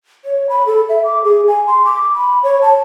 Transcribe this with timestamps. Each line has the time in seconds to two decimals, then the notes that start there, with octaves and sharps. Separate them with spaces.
0.25 C#5
0.49 B5
0.66 A4
0.89 E5
1.04 D6
1.24 G#4
1.48 G#5
1.67 C6
1.85 D6
2.15 B5
2.43 C#5
2.62 A5